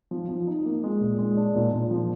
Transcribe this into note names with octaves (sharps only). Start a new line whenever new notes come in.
F3
F3
D#4
A#3
G#3
A#2
G#3
D4
A#2
A#2
F3